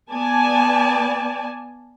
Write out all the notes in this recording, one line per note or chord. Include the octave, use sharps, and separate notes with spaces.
B3 D5 G#5 A5